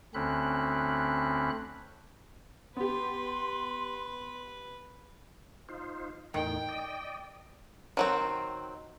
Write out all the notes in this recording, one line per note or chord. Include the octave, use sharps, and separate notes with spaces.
D2 D3 C4 C#4 B5 F#6
B3 G4 B4 C6
D#4 F4 C5
E2 A2 D#3 D#4 G5
D5 D#5
D#3 F#3 C4